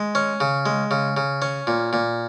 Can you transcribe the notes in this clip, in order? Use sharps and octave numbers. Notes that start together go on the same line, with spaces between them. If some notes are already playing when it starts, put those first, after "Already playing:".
Already playing: G#3
C#4
C#3
G#3
C#3
C#3
C#4
A#2
A#2